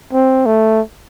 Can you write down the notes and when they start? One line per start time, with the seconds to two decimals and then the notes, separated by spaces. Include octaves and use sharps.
0.13 C4
0.46 A3